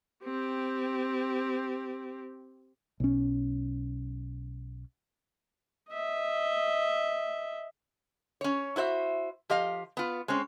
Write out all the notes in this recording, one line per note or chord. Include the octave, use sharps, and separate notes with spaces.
C4 G4
B1 C#4
D#5 E5
C#4 C#5
E4 F#4 C5 E5
F3 G4 D#5 F5
B3 F4
G#3 C4 C#4